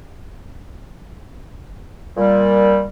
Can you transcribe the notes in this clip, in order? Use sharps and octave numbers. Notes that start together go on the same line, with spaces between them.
A#2 G3